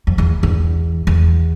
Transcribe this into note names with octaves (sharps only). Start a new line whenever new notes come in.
F2
E2
E2
E2